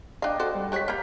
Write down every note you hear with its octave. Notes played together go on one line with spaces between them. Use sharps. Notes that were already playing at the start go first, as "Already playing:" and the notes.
D4 D#5 F5 G5 D6
F#4 A4 C5
G3
G#3 G4 C#5 F#6 B6
A#3 B5 F6 G6